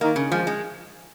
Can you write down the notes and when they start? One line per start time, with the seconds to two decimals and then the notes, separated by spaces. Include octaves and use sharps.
0.01 D#3 A#3
0.16 C#3
0.32 F3 G#3 F4
0.47 G#3